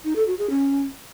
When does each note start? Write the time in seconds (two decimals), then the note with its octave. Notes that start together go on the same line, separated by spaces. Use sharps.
0.04 D#4
0.16 A4
0.27 F#4
0.39 G#4
0.50 C#4